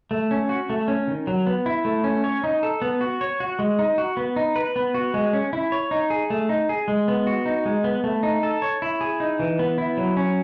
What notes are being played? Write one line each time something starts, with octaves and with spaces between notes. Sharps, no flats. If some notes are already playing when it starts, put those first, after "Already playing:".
A3
C#4
F#4
A3
C#4
D#3
F#3
B3
E4
A3
C#4
C#5
D#4
A4
B3
F#4
C#5
F#4
G#3
D#4
F#4
B3
D#4
B4
B3
F#4
G#3
C#4
E4
C#5
D#4
G#4
A3
D#4
G#4
G#3
B3
F#4
D#4
G#3
B3
A3
D#4
A4
C#5
E4
G#4
D#4
E3
B3
E4
F#3
C#4